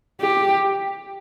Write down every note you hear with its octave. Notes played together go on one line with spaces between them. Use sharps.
G4